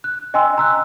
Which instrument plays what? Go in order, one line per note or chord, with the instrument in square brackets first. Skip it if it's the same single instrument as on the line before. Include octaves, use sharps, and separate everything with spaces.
[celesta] F#6
D#5 G5 G#5 C6 E6
A#5 E6 F#6